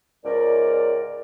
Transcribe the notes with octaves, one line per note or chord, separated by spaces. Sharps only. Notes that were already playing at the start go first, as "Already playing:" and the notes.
C#2 G#2 A#4 D5